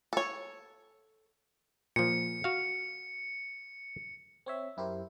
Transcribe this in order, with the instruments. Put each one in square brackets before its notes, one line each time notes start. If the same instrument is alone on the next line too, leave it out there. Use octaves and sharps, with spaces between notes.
[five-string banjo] A4 C#5
[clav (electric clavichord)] A#2 F3 [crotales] C#7
[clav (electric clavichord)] F#4 F5
[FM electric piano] C4 C#5 E5
F#2 E4 G4 A#4 C5